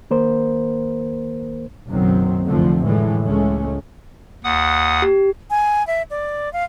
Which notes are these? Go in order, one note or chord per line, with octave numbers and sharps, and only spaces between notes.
D#3 A#3 A#4 C5
F#1 B1 F#2 D#3 F#3 C4
F1 C2 D3 F3 A3 C4
A2 D3 E3 G#3 A3
C#2 G#3 A3 C#4
D#2 F#5 D#6
G4
G#5
E5
D5
F5